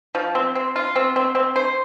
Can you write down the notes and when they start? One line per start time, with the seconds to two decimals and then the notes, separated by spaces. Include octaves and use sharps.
0.15 F3
0.35 C4
0.55 C4
0.76 F4
0.96 C4
1.16 C4
1.35 C4
1.56 C5